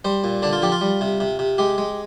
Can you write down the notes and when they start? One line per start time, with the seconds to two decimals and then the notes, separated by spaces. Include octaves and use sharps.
0.05 G3 C5
0.24 A#2
0.42 D3 D4
0.53 F4
0.62 F3 G4
0.72 F4
0.81 G3
1.01 C3
1.20 C3
1.39 C3
1.58 G#3 G4
1.78 G#3